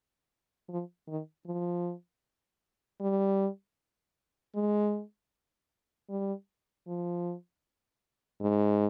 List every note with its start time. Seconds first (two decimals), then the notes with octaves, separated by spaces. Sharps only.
0.69 F3
1.08 D#3
1.46 F3
3.01 G3
4.55 G#3
6.10 G3
6.87 F3
8.41 G#2